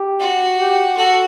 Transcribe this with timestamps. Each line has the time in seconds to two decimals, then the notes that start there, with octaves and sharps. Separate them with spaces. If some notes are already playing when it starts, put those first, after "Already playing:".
Already playing: G4
0.20 F#4
0.58 G4
0.97 F#4 A4